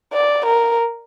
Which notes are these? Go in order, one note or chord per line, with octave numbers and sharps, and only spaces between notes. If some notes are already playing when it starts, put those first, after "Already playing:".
D5
A#4